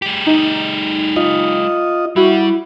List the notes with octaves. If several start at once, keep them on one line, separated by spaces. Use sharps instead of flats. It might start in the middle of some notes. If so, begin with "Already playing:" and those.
G#3 G4
D#4
F4 D#5
G3 E4 F#4